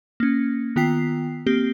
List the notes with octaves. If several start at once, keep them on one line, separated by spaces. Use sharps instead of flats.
A#3 C#4
D#3 B3 F4 G5 B6 C7
A#3 C4 G4